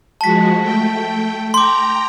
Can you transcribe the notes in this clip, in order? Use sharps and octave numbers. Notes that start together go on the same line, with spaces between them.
F3 G#3 F#4 A5 B6
A3 G5
G5 A#5 C6 D6